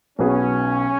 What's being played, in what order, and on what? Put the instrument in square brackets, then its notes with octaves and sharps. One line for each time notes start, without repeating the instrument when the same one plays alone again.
[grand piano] B1 B2 B3 G#4 [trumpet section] C#4